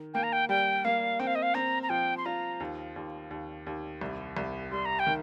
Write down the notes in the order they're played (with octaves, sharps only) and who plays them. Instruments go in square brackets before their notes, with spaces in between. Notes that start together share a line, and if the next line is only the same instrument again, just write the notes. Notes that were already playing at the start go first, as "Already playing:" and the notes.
Already playing: [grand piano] D#3
[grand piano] A#3 [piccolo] G5
[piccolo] A#5
G5
[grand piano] G3 [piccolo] G5
[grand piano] A#3 [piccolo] F5
[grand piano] C4 [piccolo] G5
[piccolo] F5
D#5
F5
[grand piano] C4 [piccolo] A#5
[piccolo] A#5
[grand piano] F3 [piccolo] G5
[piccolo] C6
[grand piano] F4 [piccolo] A#5
[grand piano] D#2
D#2
D#2
D#2
C2
C2
[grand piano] G3 [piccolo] C6
[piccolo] A#5
G5
[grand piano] D#3